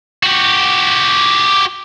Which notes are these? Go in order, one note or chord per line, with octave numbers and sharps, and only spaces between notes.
F#4 G4